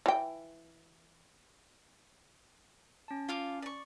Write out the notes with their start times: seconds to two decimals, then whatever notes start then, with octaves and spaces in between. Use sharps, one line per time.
0.06 E3 G5
3.08 C#4 A5
3.29 F4 F5 D6
3.62 D5 C#6